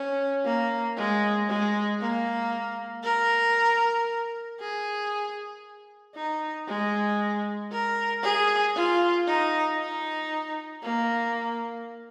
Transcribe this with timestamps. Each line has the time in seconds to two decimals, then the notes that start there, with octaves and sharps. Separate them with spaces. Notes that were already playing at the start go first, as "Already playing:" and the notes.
Already playing: C#4
0.45 A#3
0.97 G#3
1.48 G#3
2.00 A#3
3.04 A#4
4.60 G#4
6.15 D#4
6.67 G#3
7.71 A#4
8.23 G#4
8.75 F4
9.27 D#4
9.79 D#4
10.83 A#3